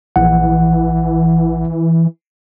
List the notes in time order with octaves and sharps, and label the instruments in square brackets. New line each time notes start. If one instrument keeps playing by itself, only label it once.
[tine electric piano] A#1 F#5 [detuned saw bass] E3